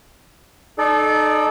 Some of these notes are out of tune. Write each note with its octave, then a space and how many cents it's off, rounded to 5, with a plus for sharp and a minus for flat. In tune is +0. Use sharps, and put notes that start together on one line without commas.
D#4 -25 A4 -25 D5 +0